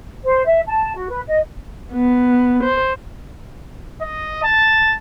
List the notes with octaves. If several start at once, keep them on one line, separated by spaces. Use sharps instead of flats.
C5
E5
A5
F#4
B4
D#5
B3
C5
D#5
A5